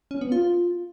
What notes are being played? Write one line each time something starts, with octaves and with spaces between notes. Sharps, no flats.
C#4
B3
F4